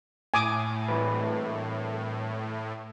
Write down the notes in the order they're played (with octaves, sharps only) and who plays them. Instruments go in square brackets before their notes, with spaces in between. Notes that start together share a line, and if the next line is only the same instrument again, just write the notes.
[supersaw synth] A2 [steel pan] G#5 D6 D#6
[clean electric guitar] G2 E3 B4